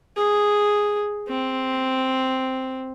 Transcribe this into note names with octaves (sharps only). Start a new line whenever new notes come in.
G#4
C4